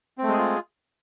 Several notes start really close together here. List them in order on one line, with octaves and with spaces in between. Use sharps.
C4 A3 G#3 G#4 F4